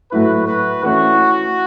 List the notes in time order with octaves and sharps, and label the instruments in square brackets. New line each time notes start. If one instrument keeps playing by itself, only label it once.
[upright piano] A2 F#3 A3 E4 [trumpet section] F#4 B4
[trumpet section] F#4 B4
[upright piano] E3 A3 C#4 E4 [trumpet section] F#4